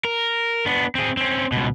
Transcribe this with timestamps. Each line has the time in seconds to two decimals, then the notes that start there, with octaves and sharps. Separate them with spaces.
0.05 A#4
0.66 B3 D4
0.95 C4 G#4
1.17 C4 C#4
1.52 C#2 B2